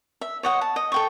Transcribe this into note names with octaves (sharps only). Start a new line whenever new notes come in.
E5
C#5 D#5 F#5
A5
D#5
A4 G5 C#6